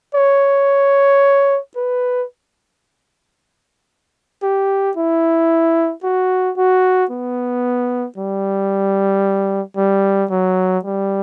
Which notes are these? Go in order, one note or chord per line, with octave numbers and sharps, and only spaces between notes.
C#5
B4
G4
E4
F#4
F#4
B3
G3
G3
F#3
G3